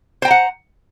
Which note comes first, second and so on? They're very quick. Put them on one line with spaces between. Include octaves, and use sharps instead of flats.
C5 G5 A#5 F#5